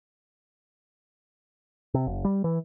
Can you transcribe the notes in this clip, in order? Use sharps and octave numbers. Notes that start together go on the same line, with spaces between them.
C3
F#1
G3
E3